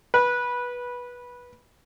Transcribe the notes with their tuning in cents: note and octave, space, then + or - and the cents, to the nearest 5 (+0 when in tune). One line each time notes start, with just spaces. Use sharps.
B4 -15